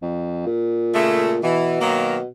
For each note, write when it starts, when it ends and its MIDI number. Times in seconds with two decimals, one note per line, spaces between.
0.02 0.44 41
0.47 1.43 46
0.95 1.35 49
0.95 1.35 56
0.95 1.35 57
1.43 2.26 47
1.43 1.77 52
1.81 2.18 51
1.81 2.18 54
1.81 2.18 58